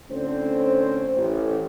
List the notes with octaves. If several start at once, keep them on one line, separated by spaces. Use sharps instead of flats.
D2 A2 D3 C4 C#4 C5
A1